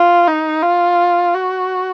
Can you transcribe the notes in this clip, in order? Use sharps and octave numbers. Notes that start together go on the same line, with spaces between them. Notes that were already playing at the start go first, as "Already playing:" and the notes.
Already playing: F4
D#4
F4
F#4